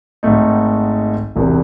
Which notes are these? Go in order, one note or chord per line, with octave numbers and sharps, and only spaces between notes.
G#1 G#2 D#3 A3 D#4
E1 E2 C3 E3